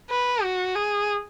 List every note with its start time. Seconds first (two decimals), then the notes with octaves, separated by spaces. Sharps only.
0.11 B4
0.43 F#4
0.76 G#4